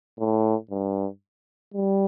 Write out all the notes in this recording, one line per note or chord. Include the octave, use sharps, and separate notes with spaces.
A2
G2
G3